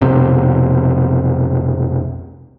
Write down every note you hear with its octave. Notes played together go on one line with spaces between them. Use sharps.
F1 B1 C3